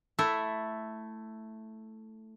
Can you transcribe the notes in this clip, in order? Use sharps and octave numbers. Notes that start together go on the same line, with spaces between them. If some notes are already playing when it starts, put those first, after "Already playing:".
A3 E4